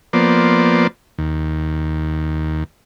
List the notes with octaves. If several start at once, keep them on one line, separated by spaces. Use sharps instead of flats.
F3 A#3 B3 C5 D5
D#2